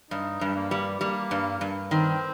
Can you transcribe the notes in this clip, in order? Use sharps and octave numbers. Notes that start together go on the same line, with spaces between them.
G2 D#4
G2 G3
A#3
G3
G3 A#3
G2
G2
D#3 C4